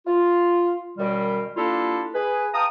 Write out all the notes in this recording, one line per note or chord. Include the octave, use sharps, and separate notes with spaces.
F4
F#2 B2 D#3 G3
G3 A#3 D4 E4 F4 A4
G#4 B4
F5 G5 A5 A#5 D#6